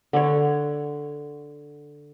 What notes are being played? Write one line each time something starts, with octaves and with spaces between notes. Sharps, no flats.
D3 C#5